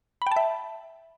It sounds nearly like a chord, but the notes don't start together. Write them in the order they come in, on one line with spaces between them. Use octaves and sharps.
B5 G5 A5 E5